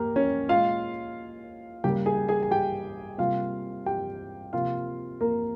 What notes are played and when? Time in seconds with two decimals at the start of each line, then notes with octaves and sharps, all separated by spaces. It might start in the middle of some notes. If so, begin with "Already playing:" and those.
Already playing: A#3 G4 A#4
0.16 C#4 C#5
0.49 A#2 G#3 F4 F5
1.84 C#3 G3 A#3 G4 G5
2.06 G#4 G#5
2.28 G#4 G#5
2.43 G#5
2.51 G4 G5
3.18 C3 G3 A#3 F4 F5
3.86 G4 G5
4.53 C3 F3 A#3 F4 F5
5.21 A#3 A#4